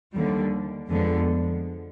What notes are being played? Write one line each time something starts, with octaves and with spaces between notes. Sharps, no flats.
D#2 D3 G3
F2 D3 F3 G#3 B3